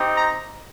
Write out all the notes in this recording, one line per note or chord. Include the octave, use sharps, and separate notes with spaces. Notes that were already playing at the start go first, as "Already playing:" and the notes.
Already playing: C4 D#4 G4
A#5